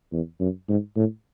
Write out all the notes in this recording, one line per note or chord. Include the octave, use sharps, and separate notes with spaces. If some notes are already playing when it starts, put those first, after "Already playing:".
E2
F#2
G#2
A2